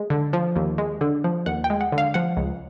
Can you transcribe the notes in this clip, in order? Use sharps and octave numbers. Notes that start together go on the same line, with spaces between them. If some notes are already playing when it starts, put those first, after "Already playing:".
Already playing: G#3
D3
F3
D#2
G#3
D3
F3
D#2 F#5
G5
G#3
F#5
D3
F5
F3 F#5
C#2